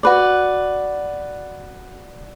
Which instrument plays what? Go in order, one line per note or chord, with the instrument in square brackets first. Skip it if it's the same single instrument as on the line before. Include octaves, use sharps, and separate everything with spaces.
[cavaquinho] F#4 B4 D5